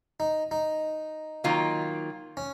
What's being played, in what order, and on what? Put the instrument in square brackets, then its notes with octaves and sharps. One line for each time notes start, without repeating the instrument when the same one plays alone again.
[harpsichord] D#4
D#4
[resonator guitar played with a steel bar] D#3 F#3 A#3 F4
[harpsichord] C#4